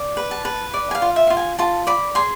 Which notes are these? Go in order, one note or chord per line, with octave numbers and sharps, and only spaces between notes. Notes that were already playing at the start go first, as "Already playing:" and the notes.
Already playing: D5
B4
A5
B4
D5
G#5
F5
F4
E5
F4 F5
G#5
F4 A5
D5 B5
G#4 C6